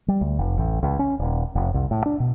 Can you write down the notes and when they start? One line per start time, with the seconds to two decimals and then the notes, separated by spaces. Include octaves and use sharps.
0.08 G3
0.21 D2
0.39 F1
0.58 A1
0.83 C#2
0.99 C#4
1.19 D#1
1.55 F1
1.74 C2
1.91 A2
2.06 D4
2.20 B2